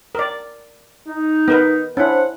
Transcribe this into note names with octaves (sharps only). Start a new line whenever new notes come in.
A#4 D5
D#4
B3 A#4 B4
C#4 D4 E4 C5 F#5